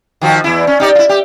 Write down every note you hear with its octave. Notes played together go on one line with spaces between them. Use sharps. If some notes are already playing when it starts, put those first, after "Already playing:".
D#3 F3 F#4
E2 E4
C#4
D#4 G4 D5
E4 F4
G4